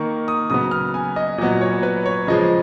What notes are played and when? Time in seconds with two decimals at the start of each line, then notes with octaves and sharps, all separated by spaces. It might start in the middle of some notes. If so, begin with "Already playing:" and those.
Already playing: D#3 A#3 C#6
0.28 D#6
0.50 C#3 F#3 B3 D#6
0.71 F6
0.94 G#5
1.16 D#5
1.38 A#2 D#5
1.41 F#3 B3
1.61 C#5
1.83 B4
2.06 C#5
2.27 C#3 F3 G#3 D#5